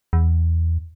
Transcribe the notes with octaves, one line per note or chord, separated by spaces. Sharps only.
E2